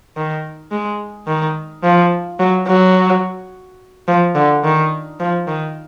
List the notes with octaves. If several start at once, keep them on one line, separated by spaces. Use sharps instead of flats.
D#3
G#3
D#3
F3
F#3
F#3
F3
D3
D#3
F3
D#3